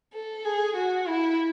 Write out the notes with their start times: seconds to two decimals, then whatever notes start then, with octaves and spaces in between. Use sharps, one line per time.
0.13 A4
0.45 G#4
0.76 F#4
1.07 E4